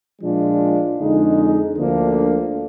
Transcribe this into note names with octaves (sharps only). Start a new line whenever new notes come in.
A#2 F3 G#3 D4 F4
F2 D3 G#3 D#4
D2 D3 F3 A#3 D4